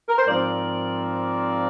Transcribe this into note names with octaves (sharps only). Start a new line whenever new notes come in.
A#4
C5
G#2 F3 C4 A#4 D5